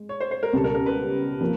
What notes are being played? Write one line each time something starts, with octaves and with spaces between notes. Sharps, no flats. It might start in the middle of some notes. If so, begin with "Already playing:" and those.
Already playing: G#3
C#5
C5
C5
A#4
C#2 B2 G3 B3 A4
A#4
A#4
B4
F3 A#3